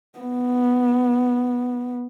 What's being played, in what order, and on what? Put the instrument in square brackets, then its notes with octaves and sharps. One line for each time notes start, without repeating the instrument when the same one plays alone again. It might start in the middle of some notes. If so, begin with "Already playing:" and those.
[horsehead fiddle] B3